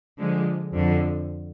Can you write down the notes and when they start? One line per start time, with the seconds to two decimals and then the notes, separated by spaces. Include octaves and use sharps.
0.19 D3 F3 G#3
0.73 F2 D3 F3